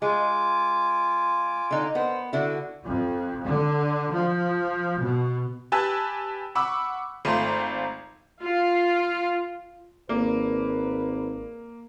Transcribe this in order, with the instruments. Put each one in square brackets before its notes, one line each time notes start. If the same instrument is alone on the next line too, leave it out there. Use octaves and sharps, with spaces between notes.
[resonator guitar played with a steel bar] G#3 [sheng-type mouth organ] F4 G#5 D6
[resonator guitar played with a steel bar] D3 D#4
[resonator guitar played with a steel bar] B3 [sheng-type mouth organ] A#4 C5
[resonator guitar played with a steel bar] D3 E4 [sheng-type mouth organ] F#4
[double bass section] F2
D3
F3
B2
[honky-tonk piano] G4 B4 G#5 A5 E6 F#6
F#5 B5 C#6 D6 E6
G#1 A3 F4 A#5 C6 D#7
[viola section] F4
[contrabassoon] G#1 [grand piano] A#3 [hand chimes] A#4 D5 [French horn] B4